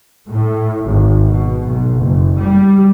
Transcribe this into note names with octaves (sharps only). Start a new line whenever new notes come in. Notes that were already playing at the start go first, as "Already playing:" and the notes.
A2
G#1
B2
B1
F#1
G3